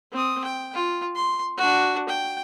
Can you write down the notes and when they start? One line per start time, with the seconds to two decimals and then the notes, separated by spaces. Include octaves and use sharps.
0.12 C4 D#6
0.44 G5
0.74 F4
1.16 C6
1.57 D4 F#4
2.09 G5